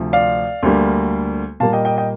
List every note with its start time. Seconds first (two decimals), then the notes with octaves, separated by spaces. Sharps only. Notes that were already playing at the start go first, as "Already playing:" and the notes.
Already playing: D2 C3 F3
0.13 D5 F5
0.63 D2 D3 G3 A#3
1.60 A#2 G3 A#3 F5 A5
1.73 D#5 G5
1.85 D#5 G5
1.97 D#5 G5